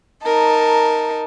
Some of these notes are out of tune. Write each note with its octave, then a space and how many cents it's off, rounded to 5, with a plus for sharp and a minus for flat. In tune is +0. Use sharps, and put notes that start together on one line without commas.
D#4 +0 A#4 +0 A5 +0